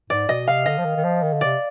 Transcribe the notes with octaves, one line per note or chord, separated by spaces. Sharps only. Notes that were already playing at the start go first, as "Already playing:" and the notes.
G#2 D5
B2 D#5
C3 F5
D3 D#5
F3
D#3
D#3
F3
D#3
D3
C3 D5